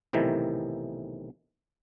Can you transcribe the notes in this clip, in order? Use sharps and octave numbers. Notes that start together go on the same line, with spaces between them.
B1 A2 C3 D#3 E3